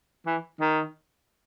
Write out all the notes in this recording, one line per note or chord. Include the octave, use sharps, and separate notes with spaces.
E3
D#3